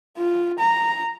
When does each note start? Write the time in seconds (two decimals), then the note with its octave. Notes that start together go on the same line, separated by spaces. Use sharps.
0.18 F4
0.59 A#5